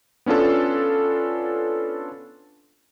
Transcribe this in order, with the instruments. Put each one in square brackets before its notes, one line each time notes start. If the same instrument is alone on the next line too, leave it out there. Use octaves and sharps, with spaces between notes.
[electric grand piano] B3 C#4 D4 F4 A4